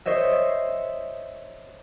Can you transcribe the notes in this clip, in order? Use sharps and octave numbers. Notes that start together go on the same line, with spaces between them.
C5 C#5 D#5 E5